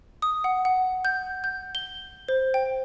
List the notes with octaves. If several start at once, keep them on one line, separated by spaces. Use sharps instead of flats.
D#6
F#5
F#5
G6
G6
G7
C5
G5